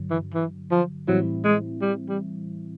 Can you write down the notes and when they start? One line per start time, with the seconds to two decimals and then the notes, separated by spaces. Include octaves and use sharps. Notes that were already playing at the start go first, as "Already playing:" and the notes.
Already playing: G2 D3 F#3
0.10 E3
0.34 E3
0.71 F3
1.08 A2 E3 F#3 G3 C4 E4
1.45 G#3
1.82 G3
2.09 G3